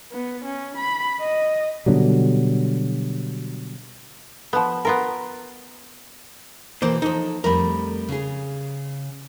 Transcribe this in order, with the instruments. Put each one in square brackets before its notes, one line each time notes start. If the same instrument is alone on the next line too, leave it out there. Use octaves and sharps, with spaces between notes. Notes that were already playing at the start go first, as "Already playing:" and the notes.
[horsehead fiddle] B3
C#4
B5
D#5
[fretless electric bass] B2 D3 F#3 G3
[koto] F3 B3
B3 F4 A#4
[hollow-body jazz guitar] B1 A#3 C5 [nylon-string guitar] E3
[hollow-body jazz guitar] F3 D#4 [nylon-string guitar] A4 A#4
[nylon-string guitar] F2 G3 A3 [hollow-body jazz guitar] A#4 B5
[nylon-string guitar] C#3 G#4